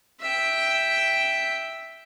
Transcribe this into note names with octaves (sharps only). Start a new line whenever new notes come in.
E5 G5